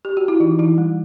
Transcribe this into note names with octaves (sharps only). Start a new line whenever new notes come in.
G4
F#4
E4
E3 D#4
E3 E4
G3